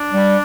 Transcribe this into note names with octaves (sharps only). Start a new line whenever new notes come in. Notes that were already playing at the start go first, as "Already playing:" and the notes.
Already playing: D4
G3